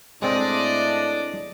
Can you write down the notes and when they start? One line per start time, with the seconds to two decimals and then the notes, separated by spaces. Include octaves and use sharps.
0.22 A2 G#3 C4 D4 D5 D#5